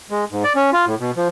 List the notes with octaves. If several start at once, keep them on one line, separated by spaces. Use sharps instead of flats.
G#3
G#2
D5
C#4
F4
A2
B2
F3